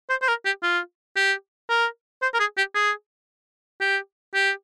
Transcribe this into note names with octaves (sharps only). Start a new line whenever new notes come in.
C5
C5
A#4
G4
F4
G4
A#4
C5
A#4
G#4
G4
G#4
G4
G4